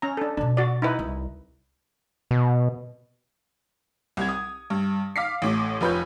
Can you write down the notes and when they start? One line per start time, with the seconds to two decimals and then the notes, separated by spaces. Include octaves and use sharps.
0.02 C#4 A#5
0.17 D4 A4
0.37 B2 C4 D4
0.57 F#4 D5
0.82 D#4 E4 B4
0.99 C2
2.31 B2
4.17 C2 G#6
4.29 D#6
4.70 G2
5.16 F5 D6 B6 C7
5.42 A1 A2 D6
5.81 F1 F3 B4 C#5 G6